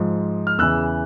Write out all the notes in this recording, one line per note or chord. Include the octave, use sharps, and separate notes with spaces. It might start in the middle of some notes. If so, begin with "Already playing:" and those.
Already playing: G#2 F3
F6
E2 C#3 E3 E6 F#6